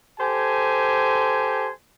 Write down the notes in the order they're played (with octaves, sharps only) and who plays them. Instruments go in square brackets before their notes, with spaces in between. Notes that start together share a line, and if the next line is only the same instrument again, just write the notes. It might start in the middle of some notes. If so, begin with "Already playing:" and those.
[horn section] G4 A4 C5 G#5